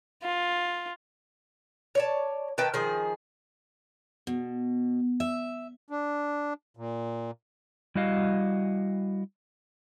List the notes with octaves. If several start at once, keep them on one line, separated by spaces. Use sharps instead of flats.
F4
C#5 D5 A5
D#3 B4 G5 A5
D#3 F3 G#4
B2
E5
D4
A#2
G3 E4 F#4 D#5 F5